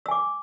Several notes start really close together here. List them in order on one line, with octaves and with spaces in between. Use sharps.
E6 G#5 D6